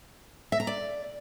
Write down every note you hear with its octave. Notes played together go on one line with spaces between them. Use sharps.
E5
A#5
D5